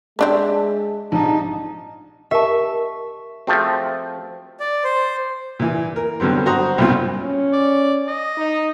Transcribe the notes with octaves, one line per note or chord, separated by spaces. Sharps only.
G#3 C4 D4 B4 E5 A5
A#1 G#2 C3 D#4 A5
G4 A#4 E5 A5 C#6
F3 A3 C4 F#4 G#4
D5
C5
A#2 E3
A#4
G2 D3 F#3 B3 C4
F#4 C5 F#5 A#5 D#6
B1 G2 A#2 C4 F4
C#4
D5
D#5
D#4